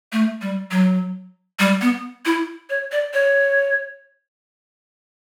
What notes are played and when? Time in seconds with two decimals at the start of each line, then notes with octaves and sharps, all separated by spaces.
0.12 A3
0.42 G3
0.71 F#3
1.59 G3
1.81 B3
2.25 E4
2.70 C#5
2.92 D5
3.14 C#5